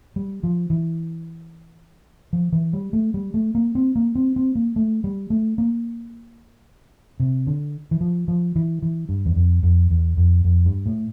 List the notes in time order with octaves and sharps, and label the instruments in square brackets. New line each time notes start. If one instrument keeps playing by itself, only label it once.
[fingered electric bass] G3
F3
E3
F3
E3
G3
A3
G3
A3
A#3
C4
A#3
C4
C4
A#3
A3
G3
A3
A#3
C3
D3
E3
F3
F3
E3
E3
G2
E2
F2
F2
E2
F2
F2
G2
A2